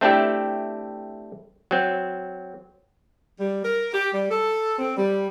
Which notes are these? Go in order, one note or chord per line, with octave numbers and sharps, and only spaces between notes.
A3 C4 D4 E4 G4 A4
F#3 C4
G3
A#4
G4
G3
A4
C4
G3